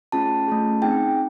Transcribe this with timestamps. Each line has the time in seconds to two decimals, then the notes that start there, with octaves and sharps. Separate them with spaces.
0.12 A3 C#4 F4 G#4 A5
0.47 A3 C#4 F4 G#4
0.82 C4 D#4 G#4 G5